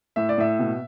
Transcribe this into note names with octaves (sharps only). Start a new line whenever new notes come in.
A2 E5
D5
A2 E5
B2